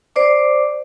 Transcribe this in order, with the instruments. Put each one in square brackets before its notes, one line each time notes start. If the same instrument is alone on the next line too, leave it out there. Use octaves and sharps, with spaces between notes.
[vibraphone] C5 D5 D6